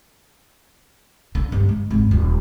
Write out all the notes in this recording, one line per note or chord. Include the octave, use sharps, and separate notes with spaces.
D3
G2 G#3
G#3
G#1 G#2
D#1